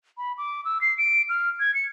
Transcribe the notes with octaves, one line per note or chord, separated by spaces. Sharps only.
B5
D6
E6
C7
D7
F6
G#6
C#7